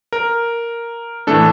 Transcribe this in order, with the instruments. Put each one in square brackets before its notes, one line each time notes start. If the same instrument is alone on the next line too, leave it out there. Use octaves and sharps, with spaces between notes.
[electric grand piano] A#4
A2 E3 A3 D4 A4